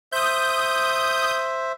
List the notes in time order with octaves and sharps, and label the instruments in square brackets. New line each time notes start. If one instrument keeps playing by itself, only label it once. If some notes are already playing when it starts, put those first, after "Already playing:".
[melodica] C5 E5 [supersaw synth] D#6 G6